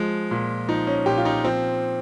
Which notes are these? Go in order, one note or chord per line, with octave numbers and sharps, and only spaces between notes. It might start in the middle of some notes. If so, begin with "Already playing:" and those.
Already playing: F3 G#3
A#2
F3 D#4
C#4
A#2 G4
F4
D#4
F3 C4